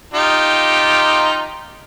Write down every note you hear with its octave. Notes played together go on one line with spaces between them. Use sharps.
D#4 F4 G4